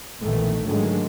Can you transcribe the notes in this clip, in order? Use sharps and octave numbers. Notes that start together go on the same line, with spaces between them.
A#1 B2 D#3 E3 A3
G#2 D3 D#3 F#3 G#3 A3